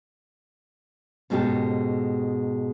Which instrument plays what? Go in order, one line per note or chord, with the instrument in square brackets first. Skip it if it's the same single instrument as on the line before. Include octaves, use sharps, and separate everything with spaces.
[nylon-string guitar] G#2 B2 G#3 C#4 G4 A4